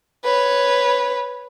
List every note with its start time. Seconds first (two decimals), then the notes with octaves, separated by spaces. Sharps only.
0.24 B4 C#5